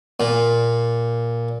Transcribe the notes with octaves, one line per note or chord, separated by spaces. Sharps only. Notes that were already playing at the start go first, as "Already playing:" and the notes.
A#2